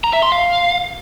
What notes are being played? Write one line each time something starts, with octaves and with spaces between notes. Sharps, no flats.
A#5
E5
C6
F5